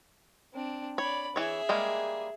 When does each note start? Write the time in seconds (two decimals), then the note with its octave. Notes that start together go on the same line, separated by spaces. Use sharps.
0.54 C4 D4
0.98 C#5 D5 B5
1.36 E3 G#4 C#5 E5
1.69 G3 G#3 A#3